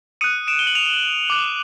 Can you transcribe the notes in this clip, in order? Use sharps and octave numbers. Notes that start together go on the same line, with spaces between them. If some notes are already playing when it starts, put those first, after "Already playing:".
D#6 F#6 C#7 D#7
D7 E7
G7
F#7
D#7 F7
D6 F#6